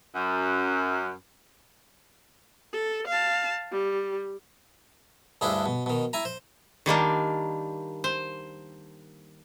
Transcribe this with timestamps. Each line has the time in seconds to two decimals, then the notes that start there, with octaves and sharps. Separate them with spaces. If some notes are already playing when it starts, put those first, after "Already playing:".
0.15 F#2
2.73 A4
3.07 F5 A5
3.71 G3
5.41 D2 G2 G#3 D4 E4 G#4
5.66 B2
5.86 B2 D#3
6.13 E4 G#5 A#5
6.25 C5
6.86 D#3 G3 A#3 D4
8.04 C5